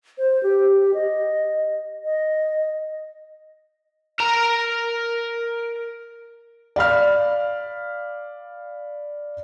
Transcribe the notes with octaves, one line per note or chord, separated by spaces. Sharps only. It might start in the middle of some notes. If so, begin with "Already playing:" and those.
C5
G4
D#5
D#5
A#4 A#5
D5 F5 B5 F6